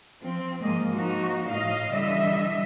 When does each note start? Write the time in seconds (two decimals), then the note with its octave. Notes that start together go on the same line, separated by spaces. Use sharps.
0.19 F3 C4
0.61 G#2 F3 A#3 D#5
0.92 F3 A#3 D#4 F#4
1.48 A2 D#5 F5
1.90 D3 E3 G3 D#5 E5